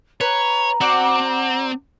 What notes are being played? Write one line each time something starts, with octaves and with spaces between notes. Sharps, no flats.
B4 C#5 A#5
C4 F#4 D5